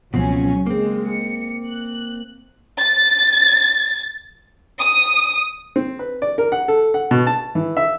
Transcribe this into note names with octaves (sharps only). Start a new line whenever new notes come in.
C#2 B2 F3 F#3 C4 C#4
G#3 A#3 C4
C#7
F#6
A6
D#6
C4
B4
D5
A#4
F#5
A4
F#5
B2
A5
E3
E5